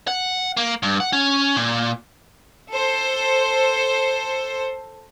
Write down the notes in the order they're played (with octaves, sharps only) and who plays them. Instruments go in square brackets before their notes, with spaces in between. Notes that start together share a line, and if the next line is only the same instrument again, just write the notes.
[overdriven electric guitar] F#5
A#3
G2
F#5
C#4
A#2
[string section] A4 C5